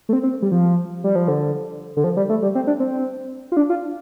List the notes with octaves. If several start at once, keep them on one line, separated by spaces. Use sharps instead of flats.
A3
C4
C4
G3
F3
G3
F3
D3
D3
F3
G3
A3
G3
C4
D4
C4
F4
D4
F4